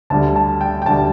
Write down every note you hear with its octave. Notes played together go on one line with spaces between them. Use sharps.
D2 D3 G3 A5
A5
G5
G5
D2 D3 G3 A5